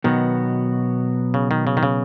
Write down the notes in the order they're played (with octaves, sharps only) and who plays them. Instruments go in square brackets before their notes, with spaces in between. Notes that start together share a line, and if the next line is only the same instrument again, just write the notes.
[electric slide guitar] B2 F#3 B3 F#4 [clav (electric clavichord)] D#3
[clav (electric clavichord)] C#3
D#3
C#3
D#3
C#3